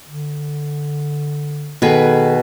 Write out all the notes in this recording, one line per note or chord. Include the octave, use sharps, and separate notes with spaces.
D3
B2 D#3 G#4 A4 B4